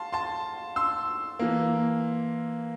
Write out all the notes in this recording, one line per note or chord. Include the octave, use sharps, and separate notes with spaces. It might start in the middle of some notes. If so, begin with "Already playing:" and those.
Already playing: F5 A5 C6
A5 C6
C6 E6
E3 A#3